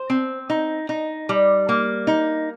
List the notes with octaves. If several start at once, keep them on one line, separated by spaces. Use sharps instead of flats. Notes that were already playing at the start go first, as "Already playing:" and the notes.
Already playing: C5
C4
D#4
D#4
G3
A#3
D#4